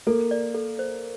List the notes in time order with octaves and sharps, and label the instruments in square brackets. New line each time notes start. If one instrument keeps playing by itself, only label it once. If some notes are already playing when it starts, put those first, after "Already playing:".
[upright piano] A#3 [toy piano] A4
[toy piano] D5
A4
C5